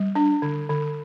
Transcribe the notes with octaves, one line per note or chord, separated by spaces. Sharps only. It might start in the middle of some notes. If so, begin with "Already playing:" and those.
Already playing: G3
D4
D3
D3